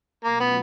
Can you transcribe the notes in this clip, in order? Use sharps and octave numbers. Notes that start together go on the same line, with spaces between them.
B2 F#3 A3 A#3 C#4 F4
B3